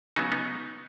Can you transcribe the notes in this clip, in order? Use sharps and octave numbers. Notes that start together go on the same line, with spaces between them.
C#3 F#3 B3 D#4 F#4
B3 D#4